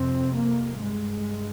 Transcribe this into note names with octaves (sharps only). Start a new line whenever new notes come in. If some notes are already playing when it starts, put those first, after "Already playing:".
Already playing: F2 C3 C4
A#3
G2 G#3